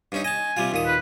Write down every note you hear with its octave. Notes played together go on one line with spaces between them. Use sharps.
G2 C#4 D#4
D#5 G#5 A5
C3 G3 F4
D#2 A#2 D#6
B4